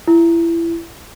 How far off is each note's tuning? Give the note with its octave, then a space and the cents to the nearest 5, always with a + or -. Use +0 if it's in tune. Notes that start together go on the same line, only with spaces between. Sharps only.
E4 +25